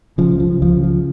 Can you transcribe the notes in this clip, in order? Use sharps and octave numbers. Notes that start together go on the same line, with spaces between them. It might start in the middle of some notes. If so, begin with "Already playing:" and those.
C#3 F3
C#2
F3
C#3
C#2 F3
C#3
F3